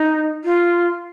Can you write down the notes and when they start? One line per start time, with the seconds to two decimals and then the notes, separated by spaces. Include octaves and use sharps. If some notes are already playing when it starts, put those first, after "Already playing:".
Already playing: D#4
0.44 F4